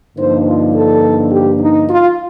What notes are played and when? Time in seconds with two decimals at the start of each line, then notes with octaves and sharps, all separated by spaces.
0.17 G2 D3 F3 A#3 D#4 C5
0.46 F4
0.74 A4
1.31 G4
1.59 D#4
1.87 F4